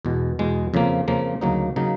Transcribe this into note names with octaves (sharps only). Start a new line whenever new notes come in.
E2 B2 G#3
E2 B2 G#3
F2 C#3 F3 A#3
F2 C#3 F3 A#3
D2 C#3 F#3 A#3 D#4
C#3 F#3 A#3 D#4